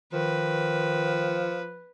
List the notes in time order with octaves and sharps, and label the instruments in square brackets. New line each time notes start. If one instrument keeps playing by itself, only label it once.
[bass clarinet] D#3 [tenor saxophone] F3 [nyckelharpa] B4